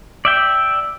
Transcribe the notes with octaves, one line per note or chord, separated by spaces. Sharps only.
D5 E5 G5